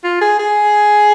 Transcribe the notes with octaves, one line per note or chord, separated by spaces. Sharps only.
F4
G#4
G#4